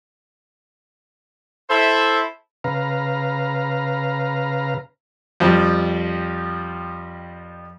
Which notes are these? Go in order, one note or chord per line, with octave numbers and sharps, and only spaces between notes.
E4 A4 C5 E5
C#3 B4 F5 A#5
F2 F3 G3